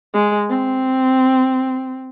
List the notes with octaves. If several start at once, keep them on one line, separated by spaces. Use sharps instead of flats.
G#3
C4